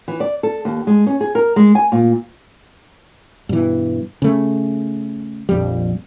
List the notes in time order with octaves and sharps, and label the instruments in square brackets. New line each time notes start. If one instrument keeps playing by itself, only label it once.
[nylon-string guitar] E3
D5
A4
D#2
G#3
C#4
G#4
A#4
G#3
G#5
A#2
[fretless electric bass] G2 B2 E3
C#3 A3
A#1 F2 G3